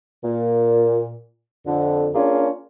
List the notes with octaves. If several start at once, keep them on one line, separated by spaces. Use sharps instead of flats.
A#2
F2 D3
A#3 C#4 D4 F4 G#4